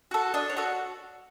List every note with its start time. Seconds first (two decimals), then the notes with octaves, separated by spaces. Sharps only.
0.11 F#4 A4
0.34 D4 D#5
0.50 C#5
0.57 F#4 A4